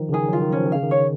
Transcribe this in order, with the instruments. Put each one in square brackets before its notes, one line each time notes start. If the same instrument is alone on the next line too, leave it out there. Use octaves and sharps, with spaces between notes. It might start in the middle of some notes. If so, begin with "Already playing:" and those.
Already playing: [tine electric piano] D#3 F3
C#3
[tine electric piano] D#3 [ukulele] G#4
[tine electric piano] F#3 [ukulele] F4
[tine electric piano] D#3
[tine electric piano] F3 [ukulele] C#4
[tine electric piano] D#3
[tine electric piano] C#3 [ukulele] F5
[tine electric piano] D#3
[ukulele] C#5